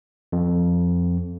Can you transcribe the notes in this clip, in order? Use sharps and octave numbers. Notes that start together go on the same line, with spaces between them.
F2